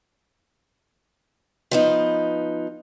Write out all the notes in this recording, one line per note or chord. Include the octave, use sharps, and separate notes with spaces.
F3 B3 D#4